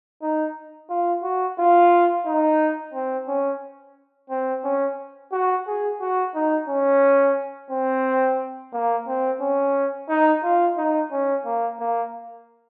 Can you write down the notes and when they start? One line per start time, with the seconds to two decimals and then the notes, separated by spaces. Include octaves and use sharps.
0.22 D#4
0.90 F4
1.23 F#4
1.58 F4
2.26 D#4
2.94 C4
3.28 C#4
4.30 C4
4.64 C#4
5.32 F#4
5.67 G#4
6.01 F#4
6.35 D#4
6.68 C#4
7.71 C4
8.73 A#3
9.07 C4
9.41 C#4
10.09 D#4
10.43 F4
10.77 D#4
11.11 C#4
11.45 A#3
11.79 A#3